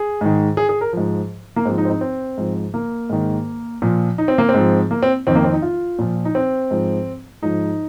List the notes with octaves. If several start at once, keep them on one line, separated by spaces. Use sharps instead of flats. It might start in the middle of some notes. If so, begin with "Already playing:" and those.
Already playing: G#4
G#2 D#3
G#4
G#4
A#4
G#2 F3
A#3
G#2 F3 C4
D#4
C4
D#4
C4
G#2 F3
A#3
G#2 D#3
A#2 F3
D#4
C4
A#3
C4
G#2 F3
A#3
C4
F2 D#3 C4
A#3
C4
D#4
F4
A#2 F3
D#4
C4
G#2 F3
G#2 F3 D#4